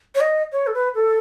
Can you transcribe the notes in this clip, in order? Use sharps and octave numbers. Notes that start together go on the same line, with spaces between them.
C#5
D#5
C#5
A4
B4
A4